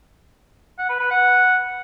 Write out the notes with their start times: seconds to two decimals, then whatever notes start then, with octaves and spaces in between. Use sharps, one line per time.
0.79 F#5
0.89 B4
1.00 B4
1.11 F#5